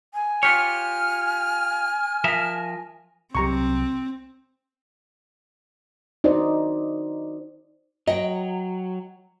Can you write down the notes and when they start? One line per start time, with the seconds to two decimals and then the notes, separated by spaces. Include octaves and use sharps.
0.14 G#5
0.43 F4 G4 C#5 F6
2.24 F3 A#4 E5
3.35 C2 C3 F#3 C4 G4 A#5 C#6
6.24 D#4 F#4 C5 D5 D#5
8.07 F#3 D#5 G5